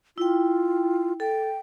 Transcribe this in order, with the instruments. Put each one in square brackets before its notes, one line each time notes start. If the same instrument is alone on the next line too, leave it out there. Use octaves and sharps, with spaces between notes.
[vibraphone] E4 G5 [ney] F4
[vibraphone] A4 [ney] G5